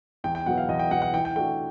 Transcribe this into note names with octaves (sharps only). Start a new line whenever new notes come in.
E2 G5
G5
B2 F#3 B3 F#5
F5
E2 D#5
G5
B2 F#3 B3 F#5
F#5
E3 G5
G5
A3 D4 F#4 G5